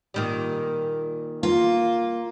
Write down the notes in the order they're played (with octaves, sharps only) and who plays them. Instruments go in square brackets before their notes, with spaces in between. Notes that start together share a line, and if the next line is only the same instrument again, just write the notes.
[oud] A#2 D#3 G3
[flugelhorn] A#3 [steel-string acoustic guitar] F4